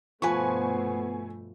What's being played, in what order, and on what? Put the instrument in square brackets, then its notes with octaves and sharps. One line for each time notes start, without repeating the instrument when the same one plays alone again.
[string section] G2 B2 A3 [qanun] F3 B4 [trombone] B3 [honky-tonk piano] G#5 C#6